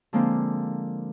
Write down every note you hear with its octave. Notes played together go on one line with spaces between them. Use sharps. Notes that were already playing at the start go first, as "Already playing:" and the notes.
D3 F3 G#3 A#3 C4